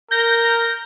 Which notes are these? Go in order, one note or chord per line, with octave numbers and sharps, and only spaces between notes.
A#4 G6 A#6